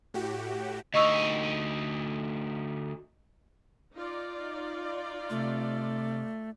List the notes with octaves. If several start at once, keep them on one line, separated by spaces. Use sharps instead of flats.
A2 F#4 G4
D2 D#4 D#5 C#6 E6
D#4 F4 D5
C3 A3